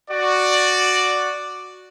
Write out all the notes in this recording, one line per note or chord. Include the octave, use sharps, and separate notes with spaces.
F#4 D5